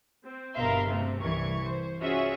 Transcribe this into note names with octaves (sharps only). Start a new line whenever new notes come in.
C4
G1 B2 A#4 E5 F5 C6
C3 A3
C2 E3 C#6 G#6
C5
C#4 F4 F#4 G#4 E5